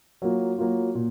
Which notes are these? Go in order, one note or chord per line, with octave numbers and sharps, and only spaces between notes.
F#3 A#3 F4
F#3 A#3 F4
A#2